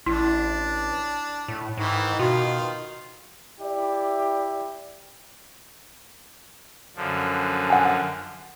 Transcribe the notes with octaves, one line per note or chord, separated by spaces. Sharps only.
A1 D4 E4
A2
G#2 D#3 E3
B2 D#3 F4 F#4
E4 G4 D5
F#2 D3 F3
F#5 G#5